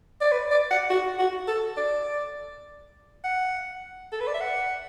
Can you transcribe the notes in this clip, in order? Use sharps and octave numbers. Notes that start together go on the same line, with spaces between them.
D5
B4
D5
F#5
F#4
F#4
A4
D5
F#5
A4
B4
D5
E5
F#5